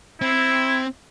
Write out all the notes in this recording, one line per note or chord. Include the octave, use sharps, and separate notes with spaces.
C4 E4